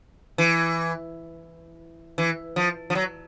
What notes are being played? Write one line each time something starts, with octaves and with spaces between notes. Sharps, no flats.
E3
E3
F3
F3
F#3